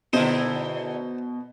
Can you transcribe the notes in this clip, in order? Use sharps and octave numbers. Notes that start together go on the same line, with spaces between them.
B2 D3 D#4 E4 G#4 C5